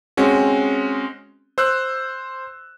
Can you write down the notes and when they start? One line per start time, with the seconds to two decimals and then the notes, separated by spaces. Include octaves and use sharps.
0.17 G#3 C4 C#4 F#4
1.58 C5 E6 F#6